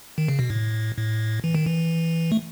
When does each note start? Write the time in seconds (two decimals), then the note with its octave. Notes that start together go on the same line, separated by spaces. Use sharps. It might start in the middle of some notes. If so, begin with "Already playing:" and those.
0.18 D#3
0.28 C#3
0.39 B2
0.50 A2
0.97 A2
1.44 E3
1.55 D#3
1.66 E3
2.32 A3